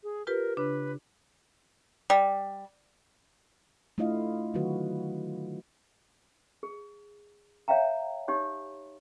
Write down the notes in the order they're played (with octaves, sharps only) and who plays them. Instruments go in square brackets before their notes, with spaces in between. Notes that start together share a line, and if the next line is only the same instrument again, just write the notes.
[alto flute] G#4
[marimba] F4 G4 B4 [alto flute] A#4
[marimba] C#3 D4 [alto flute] B4
[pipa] G3
[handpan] A3 D4 E4 F4 D#5 F5
D3 D#3 F#3 A3 F#4 B4
[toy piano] G#4
C#5 E5 F5 G5 A#5
D#4 G4 C#5 C6